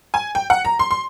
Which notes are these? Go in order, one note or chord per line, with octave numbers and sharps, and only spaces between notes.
G#5
G5
F#5
A#5
C6
C6